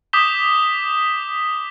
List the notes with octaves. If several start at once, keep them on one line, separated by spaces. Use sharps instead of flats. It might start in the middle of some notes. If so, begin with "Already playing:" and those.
D6 D#6 G6 B6 E7 G7